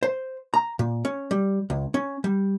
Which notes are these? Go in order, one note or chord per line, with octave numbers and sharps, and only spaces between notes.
C5
A#5
A#2
C#4
G3
C#2
C#4
G3